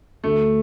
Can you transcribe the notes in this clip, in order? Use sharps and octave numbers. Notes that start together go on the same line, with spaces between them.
D2 A3